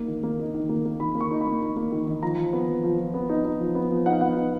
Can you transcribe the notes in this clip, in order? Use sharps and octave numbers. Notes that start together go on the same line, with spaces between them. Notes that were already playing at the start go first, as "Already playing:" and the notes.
Already playing: A#3 D#4
D#3
A#3
D#4
D#3
A#3
A#3
D#3 B5
A#3
C#6
D#4
B5
A#3
D#4
A#3
D#3
D#3
F3 A#5
F3
B3
F3
F3
F3
B3
D#4
D#4
F3
B3
F3
D#4 F#5
F5
B3 F#5
D#4